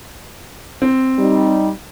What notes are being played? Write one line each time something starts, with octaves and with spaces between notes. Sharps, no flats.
C4
G3 D#4